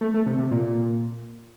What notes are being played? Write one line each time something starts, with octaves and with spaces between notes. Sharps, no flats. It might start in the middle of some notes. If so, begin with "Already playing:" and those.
A3
A3
C3
C3
A#2